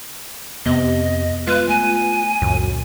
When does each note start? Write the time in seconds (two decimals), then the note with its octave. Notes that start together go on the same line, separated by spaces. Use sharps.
0.66 F2 C3 B3 C4 D#5
1.47 G#3 F4 B4
1.68 A3 G#5
2.42 C#2 F#2 A#2 D#3